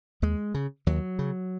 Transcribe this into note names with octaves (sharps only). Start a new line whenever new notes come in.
D#2 G#3
C#3
D#2 F#3
C#3